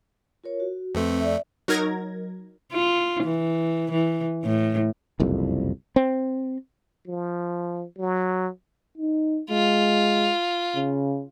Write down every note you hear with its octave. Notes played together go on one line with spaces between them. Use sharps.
F4 A#4 C#5
F#4
F2 A3 C4 B4
D5 E5
F#3 D#4 A#4 G#6 A#6
F4
E3
E3
A2
F#1 C2 F2
C4
F3
F#3
D#4
G#3 F4
C#3